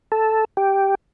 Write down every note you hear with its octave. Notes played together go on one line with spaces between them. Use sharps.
A4
G4